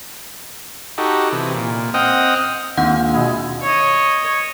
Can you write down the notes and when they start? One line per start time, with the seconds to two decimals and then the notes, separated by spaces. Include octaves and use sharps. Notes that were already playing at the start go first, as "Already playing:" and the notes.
0.98 D#4 F#4 G4 A4
1.32 C3 E3
1.54 A#2
1.94 C4 D#5 F#5 G5 D#6 F6
2.77 D#2 G#3 C4 D4 F4 F#5
3.14 B2 E4 G#4
3.62 C#5 D#5